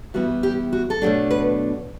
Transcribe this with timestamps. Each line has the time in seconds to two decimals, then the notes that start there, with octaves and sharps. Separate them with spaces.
0.14 E3 G3 B3 E4 F#4
0.43 G4
0.73 F#4
0.90 A4
1.02 B2 F#3 A3 D4 G4
1.31 B4